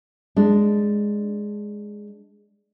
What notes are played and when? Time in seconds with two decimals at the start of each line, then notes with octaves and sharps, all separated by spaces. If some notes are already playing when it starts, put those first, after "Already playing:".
0.36 G#3 D4